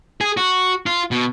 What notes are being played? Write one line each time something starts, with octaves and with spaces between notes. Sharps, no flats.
G#4
F#4
F4
B2